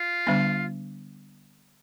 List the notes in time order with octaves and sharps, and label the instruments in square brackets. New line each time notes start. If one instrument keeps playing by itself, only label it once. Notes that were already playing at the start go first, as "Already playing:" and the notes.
Already playing: [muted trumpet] F4
[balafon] D3 G3 B3 D4